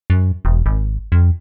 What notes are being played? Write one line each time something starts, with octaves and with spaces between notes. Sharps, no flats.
F#2
E1
G#1
F2